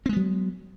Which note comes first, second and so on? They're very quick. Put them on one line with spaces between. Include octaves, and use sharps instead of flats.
C4 G#3 B3 F#3